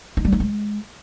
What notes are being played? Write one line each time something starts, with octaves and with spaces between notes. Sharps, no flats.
D#4
G3
D#4
G#3